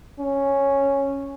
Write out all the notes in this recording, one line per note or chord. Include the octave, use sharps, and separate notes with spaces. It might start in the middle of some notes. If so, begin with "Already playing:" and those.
C#4